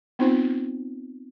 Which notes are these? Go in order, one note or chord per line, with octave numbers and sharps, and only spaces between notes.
B3 C4 D#4 F4 C5